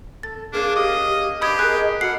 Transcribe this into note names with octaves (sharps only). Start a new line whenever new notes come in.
A4 A6
A#3 C#4 D4 G#4 F5
G4 D#5 D6
B3 D4 G4 D#5 B5 D#6 G#6
G#4 A#4 F#6
F#4 A4 F#5 B5 F6 C7